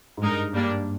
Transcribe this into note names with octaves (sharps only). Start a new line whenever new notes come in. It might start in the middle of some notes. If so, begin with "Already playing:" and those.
G#2
G2 G#3 D#4 A#4 D#5
G2 G3 A#3 D4